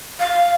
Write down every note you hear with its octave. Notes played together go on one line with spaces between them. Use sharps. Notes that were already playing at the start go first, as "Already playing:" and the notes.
F5